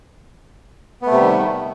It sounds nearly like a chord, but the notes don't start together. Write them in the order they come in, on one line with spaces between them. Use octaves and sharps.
B3 A3 C3 G3 D#3